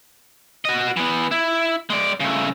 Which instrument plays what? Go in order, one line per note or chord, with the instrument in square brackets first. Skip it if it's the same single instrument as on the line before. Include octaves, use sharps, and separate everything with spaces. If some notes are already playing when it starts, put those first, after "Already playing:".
[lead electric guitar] F#4 D#5
E3 B3
E4
G#3 D5
C#3 A3